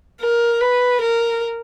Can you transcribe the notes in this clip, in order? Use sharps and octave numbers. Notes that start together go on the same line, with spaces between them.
A#4
B4
A#4